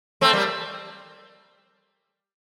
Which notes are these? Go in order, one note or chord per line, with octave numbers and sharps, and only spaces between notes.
A3 C4
G3 A#3